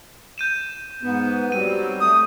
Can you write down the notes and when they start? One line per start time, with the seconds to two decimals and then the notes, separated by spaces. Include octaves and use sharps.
0.38 G6 D#7 E7
1.03 G#2 B3
1.52 F#3 G3 C4 D#7
2.01 A3 D#6